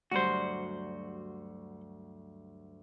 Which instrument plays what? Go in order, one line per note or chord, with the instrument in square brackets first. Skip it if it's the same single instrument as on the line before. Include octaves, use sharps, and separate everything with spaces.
[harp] D2 G2 F#3 [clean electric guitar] F#4 C5